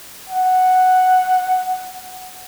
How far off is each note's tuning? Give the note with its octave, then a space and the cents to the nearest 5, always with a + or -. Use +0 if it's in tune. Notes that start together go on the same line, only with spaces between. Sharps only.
F#5 +0